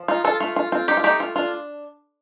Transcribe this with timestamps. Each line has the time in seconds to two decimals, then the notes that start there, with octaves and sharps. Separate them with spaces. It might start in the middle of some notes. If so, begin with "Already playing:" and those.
Already playing: F3
0.08 D#4 F4
0.25 F4 A4
0.40 A3 F4
0.56 F4
0.72 C4 F4
0.88 D#4 G4
0.97 F4
1.04 A3 D#4 G4
1.20 F4
1.36 D4 F4